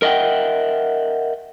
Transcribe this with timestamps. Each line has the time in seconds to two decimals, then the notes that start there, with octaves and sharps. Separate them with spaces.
0.02 A#4 D#5 E5 F#5 G5